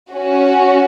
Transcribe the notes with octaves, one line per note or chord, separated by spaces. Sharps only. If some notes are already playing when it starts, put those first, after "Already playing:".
C#4 F#4